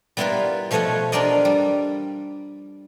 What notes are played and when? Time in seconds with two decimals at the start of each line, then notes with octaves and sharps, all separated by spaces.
0.17 G3 B3 E4 F4 A#4 B4
0.71 B2 F3 A3 C#5 D#5 F#5
1.12 D4 F4 G4 A#4 D5 D#5
1.45 G3